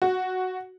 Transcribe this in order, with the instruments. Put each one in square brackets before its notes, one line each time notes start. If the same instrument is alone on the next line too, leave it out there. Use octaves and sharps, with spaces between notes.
[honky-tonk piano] F#4